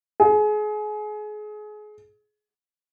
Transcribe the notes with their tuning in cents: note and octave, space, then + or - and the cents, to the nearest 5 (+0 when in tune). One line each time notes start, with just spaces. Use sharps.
G#4 +30